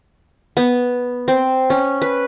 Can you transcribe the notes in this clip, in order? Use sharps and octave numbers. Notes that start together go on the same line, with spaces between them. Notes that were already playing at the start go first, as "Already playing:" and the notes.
B3
C4
C#4
B4